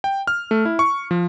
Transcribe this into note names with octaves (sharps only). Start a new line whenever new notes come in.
G5
F6
A3
E4
C#6
F3